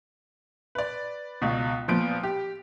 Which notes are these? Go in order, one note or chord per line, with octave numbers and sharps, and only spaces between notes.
B4 D5
C#2 B2
A#2 F3 B3 D7
G4